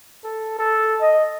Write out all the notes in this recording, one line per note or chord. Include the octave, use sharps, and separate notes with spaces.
A4
A4
D#5